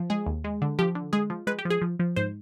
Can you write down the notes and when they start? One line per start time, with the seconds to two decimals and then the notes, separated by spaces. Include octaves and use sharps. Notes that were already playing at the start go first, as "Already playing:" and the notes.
Already playing: F3
0.10 G#3 G#4
0.26 D#2
0.44 G#3
0.62 D3
0.79 F3 G4
0.95 D3
1.13 G#3 G#4
1.30 F3
1.47 G#3 B4
1.58 G4
1.65 F3
1.70 G#4
1.82 F3
1.99 F3
2.16 G#2 C5